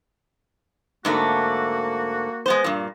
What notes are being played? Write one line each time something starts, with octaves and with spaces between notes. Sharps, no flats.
G#2 D3 A3 A#3 F#4
G#3 B3 C5
G2 A#2